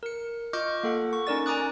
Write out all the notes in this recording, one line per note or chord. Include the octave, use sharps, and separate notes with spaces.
A#4 C#7
F4 D#5 C#6 D6 F6 G6
A#3 A4 F#5
C#6
C#4 D#4 A#4 D5 A6
G#5 A#5 D6 D#6 F#6